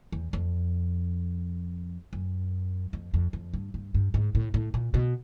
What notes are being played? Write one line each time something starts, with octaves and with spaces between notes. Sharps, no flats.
E2
F2
F#2
F2
F2
F2
G2
G2
G2
G#2
A2
A2
A#2
B2